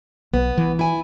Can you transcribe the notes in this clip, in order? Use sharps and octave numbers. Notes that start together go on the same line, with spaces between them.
B1 B3
E3
E4 G#5